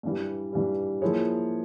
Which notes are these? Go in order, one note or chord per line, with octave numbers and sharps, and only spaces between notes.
G2 E3 G3
G2 E3 G3
F3 A#3 E4 G#4 C#5